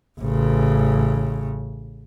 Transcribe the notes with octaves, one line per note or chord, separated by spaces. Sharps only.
A1 C#3